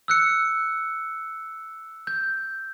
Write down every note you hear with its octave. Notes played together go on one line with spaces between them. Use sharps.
E6 F#6 C#7
G6